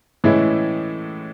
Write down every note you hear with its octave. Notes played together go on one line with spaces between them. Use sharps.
A2 E3 G#3 C#4 E4